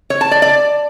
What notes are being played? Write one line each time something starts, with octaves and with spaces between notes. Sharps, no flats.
C#5
A5
D5
D5